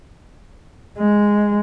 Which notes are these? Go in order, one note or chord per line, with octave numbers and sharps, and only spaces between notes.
G#3